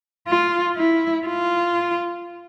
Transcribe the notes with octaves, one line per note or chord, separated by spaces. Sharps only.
F4
E4
F4